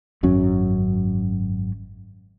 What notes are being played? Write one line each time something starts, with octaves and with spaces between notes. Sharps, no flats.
G#1 F#2 F#3 C#4